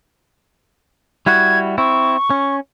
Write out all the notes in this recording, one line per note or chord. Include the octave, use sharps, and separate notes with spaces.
G3 E4 F#4 G#6
C4 E4 C#6
C#4